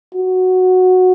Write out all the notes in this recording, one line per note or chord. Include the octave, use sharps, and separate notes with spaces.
F#4